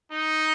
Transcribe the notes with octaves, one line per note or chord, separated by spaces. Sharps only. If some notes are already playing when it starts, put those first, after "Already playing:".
D#4